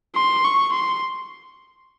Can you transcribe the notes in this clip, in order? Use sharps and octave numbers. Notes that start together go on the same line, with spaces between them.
C6
C#6
C6